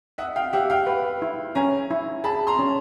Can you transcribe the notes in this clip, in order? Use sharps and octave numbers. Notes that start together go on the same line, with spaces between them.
D#5 E5 F#5
F5 G5
G4 E5 F#5
F5 G5
B4
E4
C#4 G#5 A#5
E4
G#4 A5 B5
A#5 C6
C#4